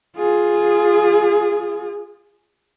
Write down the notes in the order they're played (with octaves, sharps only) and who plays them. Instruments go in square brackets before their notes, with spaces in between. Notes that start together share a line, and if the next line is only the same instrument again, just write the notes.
[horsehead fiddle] F4 G#4